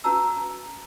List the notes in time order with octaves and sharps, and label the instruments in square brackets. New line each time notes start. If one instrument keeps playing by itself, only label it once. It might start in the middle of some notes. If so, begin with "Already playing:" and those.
[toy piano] C#4 F#4 B4 A5 A#5 E6